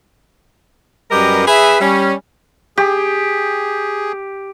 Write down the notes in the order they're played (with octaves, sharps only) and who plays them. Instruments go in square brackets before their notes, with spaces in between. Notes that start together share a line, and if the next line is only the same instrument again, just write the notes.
[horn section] F#2 G3 G4 A#4 B4 D#5
G#4 B4 E5
G3 C#4
[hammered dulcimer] G4 [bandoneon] G#4